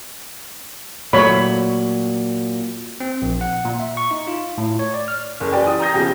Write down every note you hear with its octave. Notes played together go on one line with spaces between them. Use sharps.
A#2 F#3 A3 C#5 B5
C4
A#1
F#5
A#2
E5
C#6
D#4
F4
A2
C#5
D5
F6
F#1
G4 B4 D5 G5 G#5
E3 D#6
A#5 D#6 G6 A#6
B1 C#3 F3 G4